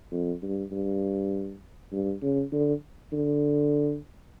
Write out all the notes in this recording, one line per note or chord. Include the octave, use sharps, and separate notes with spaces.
F2
G2
G2
G2
C#3
D3
D3